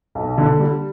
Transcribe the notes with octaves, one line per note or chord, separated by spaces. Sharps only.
B1
D3
G3